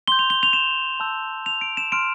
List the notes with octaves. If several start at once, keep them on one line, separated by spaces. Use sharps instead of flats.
C6 G6 G7
F7
G7
F7
E7
A5 C6 E6 G6
F7
D7
E7
C6 F6 D7